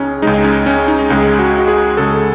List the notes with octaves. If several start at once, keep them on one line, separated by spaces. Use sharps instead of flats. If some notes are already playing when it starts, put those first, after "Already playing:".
Already playing: C#2 C#3 G#3 C#4 D#4
C#2 C#3 G#3 D#4
C#4
C#4
D#4
C#2 C#3 G#3
F#4
F#4
G#4
C#2 C#3 G#3 A4